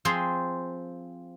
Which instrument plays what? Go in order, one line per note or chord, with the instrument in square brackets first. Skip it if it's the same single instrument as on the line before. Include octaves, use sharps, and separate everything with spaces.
[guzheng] F3 C4 G#4 C5 C6